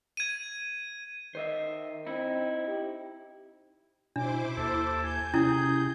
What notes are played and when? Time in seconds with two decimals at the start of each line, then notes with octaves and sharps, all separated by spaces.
0.17 G#6 D#7
1.35 D#3 C5 D#5 E5
2.06 C4 D#4 E4
2.68 G4
4.16 B2 D4 E4 C5 D6
4.57 D#2 A4
5.03 G#5 G6
5.34 C3 C#4 E4 G#4